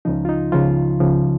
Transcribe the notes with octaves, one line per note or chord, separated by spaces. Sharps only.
C#2 C#3 F3 D#4
F4
D#4
C#2 C#3 F3 F4
C#2 C#3 F3